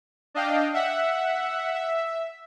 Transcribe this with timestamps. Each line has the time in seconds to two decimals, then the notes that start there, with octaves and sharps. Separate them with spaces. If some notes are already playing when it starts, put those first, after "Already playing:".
0.34 D4 D#5 F5 G5
0.74 E5 F#5
1.74 E5